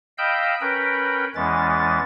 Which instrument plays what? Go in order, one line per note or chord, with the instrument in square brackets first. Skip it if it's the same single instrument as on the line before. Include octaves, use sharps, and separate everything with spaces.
[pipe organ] D#5 F5 G5 B5 E6 G6
C#4 A#4 B4 G5 B5
E2 E3 G#3 C#4 A6